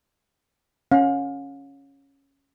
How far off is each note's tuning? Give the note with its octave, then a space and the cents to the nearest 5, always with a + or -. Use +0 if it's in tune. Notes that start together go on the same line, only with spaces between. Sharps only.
C#4 -5 F5 +40